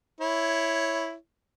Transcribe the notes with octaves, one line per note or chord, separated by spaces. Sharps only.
E4 C#5